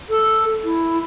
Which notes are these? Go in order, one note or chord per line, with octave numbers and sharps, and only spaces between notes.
A4
E4